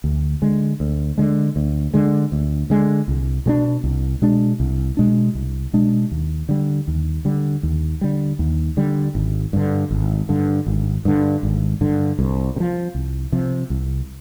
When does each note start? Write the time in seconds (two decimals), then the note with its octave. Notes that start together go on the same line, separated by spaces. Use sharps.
0.04 D2
0.42 D3 G#3
0.80 D2
1.18 D3 G#3
1.56 D2
1.94 D3 G#3
2.32 D2
2.70 D3 G#3
3.08 C2
3.46 B2 G#3 D4
3.84 C2
4.22 B2 G#3 D4
4.60 C2
4.97 B2 G#3 D4
5.35 C2
5.73 B2 G#3 D4
6.12 D#2
6.49 D3 G3
6.88 D#2
7.25 D3 G3
7.63 D#2
8.01 D3 G3
8.39 D#2
8.77 D3 G3
9.15 G#1
9.53 G2 D3
9.91 G#1
10.29 G2 D3
10.66 G#1
11.05 G2 D3
11.43 G#1
11.81 G2 D3
12.19 C2
12.56 C3
12.60 F3
12.95 C2
13.32 C3 F3
13.70 C2